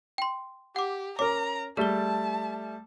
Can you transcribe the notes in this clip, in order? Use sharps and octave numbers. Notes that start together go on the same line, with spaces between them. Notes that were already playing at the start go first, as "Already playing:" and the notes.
G5 C6
G4 F#5 D6
C#4 A#4 A#5 D6
G3 A3 G#4 A5 G7